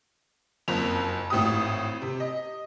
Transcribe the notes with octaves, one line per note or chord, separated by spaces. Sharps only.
F#1 F2 A#3 F7
G#1 A2 G4 D#6
C3
D#5